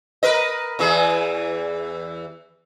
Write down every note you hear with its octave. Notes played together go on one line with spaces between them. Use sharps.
A#4 B4 D#5
E2 E3 G#4